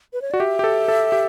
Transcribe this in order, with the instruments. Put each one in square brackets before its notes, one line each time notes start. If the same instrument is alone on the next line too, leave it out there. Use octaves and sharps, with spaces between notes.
[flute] B4
C#5
[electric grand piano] F#4 [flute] D5
[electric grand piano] G4 [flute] E5
[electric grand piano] G4
A4
A4
G4